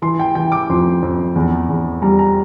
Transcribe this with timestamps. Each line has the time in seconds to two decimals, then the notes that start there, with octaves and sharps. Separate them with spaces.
0.02 E3 C6
0.19 G5
0.35 E3 G5
0.52 D6
0.69 F2 C6
1.02 F2
1.36 E2
1.69 E2
2.02 G3 A#5
2.19 A#5